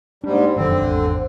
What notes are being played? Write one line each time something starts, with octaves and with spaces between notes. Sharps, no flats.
G#2 G3 A#3 D4
F1 F#2 D3 D#3 C4
G#1 E2